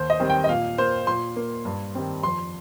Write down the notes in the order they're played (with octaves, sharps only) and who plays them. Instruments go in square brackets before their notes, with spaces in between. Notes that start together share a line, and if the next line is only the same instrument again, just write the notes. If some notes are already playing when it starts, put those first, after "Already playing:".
Already playing: [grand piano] D#2 C5
D#5
D#3 G3 C4
G5
D#5
A#2 F5
A#3 C5
A#2 C6
A#3
G2
D#3 G3 C4
F2 C6